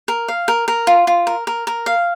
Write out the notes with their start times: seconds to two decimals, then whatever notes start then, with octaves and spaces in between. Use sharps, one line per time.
0.08 A#4
0.28 F5
0.48 A#4
0.68 A#4
0.87 F4
1.07 F4
1.27 A#4
1.47 A#4
1.67 A#4
1.86 F5